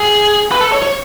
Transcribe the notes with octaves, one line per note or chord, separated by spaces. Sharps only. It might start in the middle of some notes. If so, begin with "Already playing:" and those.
Already playing: G#4
B4
A4
C#5
C#5